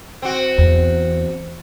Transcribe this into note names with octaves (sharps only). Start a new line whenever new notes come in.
C4 F#4
E2